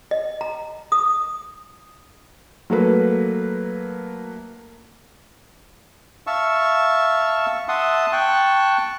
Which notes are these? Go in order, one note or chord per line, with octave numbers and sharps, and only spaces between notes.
D#5
A#5
D#6
F#3 A3 A#3 B4
E5 F5 A5 C#6 E6
E5 F#5 A5 C6 D#6
G5 A5 C#6 F#6